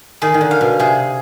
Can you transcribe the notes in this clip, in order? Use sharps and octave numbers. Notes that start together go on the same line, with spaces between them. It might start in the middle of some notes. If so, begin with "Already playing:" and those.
D#3 G#4
D#3
D3
F5
B2
C3 G#4